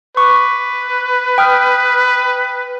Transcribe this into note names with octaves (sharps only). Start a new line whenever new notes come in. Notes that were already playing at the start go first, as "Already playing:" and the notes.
B4 C#6 D6
G5 D#6 F6